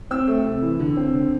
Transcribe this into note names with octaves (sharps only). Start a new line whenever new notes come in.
C4 E6
A3
C3
E3
D3
C4
D3